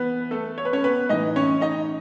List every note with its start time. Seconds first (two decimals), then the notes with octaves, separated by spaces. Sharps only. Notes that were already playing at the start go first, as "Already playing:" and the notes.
Already playing: E3 B3 B4
0.31 A3 A4
0.58 C#5
0.65 B4
0.73 C#4 C#5
0.84 B3 B4
1.09 A2 E3 D#4 D#5
1.36 C#4 C#5
1.61 D#4 D#5